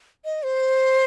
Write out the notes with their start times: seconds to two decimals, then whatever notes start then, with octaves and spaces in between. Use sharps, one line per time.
0.25 D#5
0.44 C5